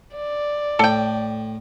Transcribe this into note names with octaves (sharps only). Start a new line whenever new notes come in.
D5
A2 A4 G5